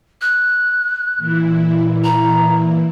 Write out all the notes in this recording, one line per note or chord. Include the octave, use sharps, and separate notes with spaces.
F#6
A#2 E3 E4
A#5